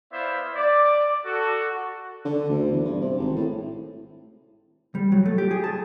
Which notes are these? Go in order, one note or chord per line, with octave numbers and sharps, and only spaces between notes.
B3 E4 C5 D5 E5 F5
D5
F#4 A4
D3
D2
E2
G2
C3
G#1
A2
G3
F#3
A3
G4
G#4
A5